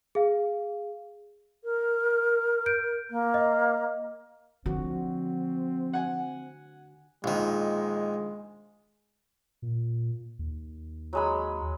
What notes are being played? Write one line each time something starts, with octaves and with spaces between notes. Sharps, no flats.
G#4 F5
A#4
G6 D7
A#3
D#5
D3 F3 C4 F#4
F#5 G#5
A#1 D#3 G#3
A#2
D#2
F#3 G#3 B5